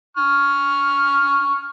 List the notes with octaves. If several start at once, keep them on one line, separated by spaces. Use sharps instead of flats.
C#6 F6